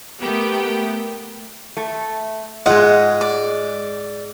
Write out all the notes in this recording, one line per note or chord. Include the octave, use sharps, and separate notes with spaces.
A3 B3 G4 A#4 G5
A3
G#2 G#3 D#4 F4 F#5
D5